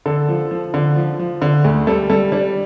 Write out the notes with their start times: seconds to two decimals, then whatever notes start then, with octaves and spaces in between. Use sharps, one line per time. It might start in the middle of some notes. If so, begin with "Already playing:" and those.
0.06 D3 A4
0.29 F3
0.51 F3
0.74 D3
0.96 F3
1.19 F3
1.42 D3
1.64 D2
1.87 G3 A4
2.10 G3 A4
2.32 G3 D4